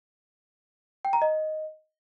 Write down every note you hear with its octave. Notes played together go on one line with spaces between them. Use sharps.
G5
A#5
D#5